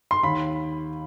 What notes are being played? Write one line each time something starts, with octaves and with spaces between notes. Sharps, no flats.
C6
D#2 B5